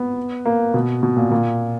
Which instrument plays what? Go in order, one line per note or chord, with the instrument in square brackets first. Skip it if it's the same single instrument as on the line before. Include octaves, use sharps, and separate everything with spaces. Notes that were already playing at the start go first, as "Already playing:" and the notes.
Already playing: [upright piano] B3
A#3
B2
B2
A#2
A#2